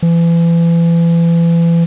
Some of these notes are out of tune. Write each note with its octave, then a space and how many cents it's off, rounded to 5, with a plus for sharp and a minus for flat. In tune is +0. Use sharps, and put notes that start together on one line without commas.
E3 +35